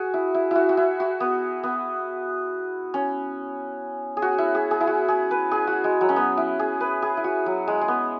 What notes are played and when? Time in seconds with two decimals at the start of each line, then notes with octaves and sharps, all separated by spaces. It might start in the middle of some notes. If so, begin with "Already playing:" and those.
Already playing: F#4 G#4
0.14 E4
0.34 E4
0.51 E4 F#4
0.69 F#4
0.77 E4
1.00 F#4
1.20 B3
1.63 B3
2.94 C#4
4.17 G#4
4.22 F#4
4.38 E4
4.55 G#4
4.71 G#4
4.81 E4
4.87 F#4
5.08 G#4
5.31 B4
5.51 G#4
5.67 F#4
5.84 G#3
6.01 F#3
6.09 C#4
6.16 B3
6.37 E4
6.59 G#4
6.80 B4
7.02 G#4
7.17 E4
7.24 F#4
7.46 F#3
7.68 G#3
7.81 G#3
7.88 B3